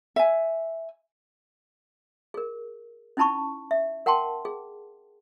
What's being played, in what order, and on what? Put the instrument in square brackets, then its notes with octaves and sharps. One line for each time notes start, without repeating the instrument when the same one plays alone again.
[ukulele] E5 G#5
[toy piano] G#4 A#4
C#4 D#4 E4 A5 B5 C#6
E5
A#4 F#5 G5 A5 C6
G#4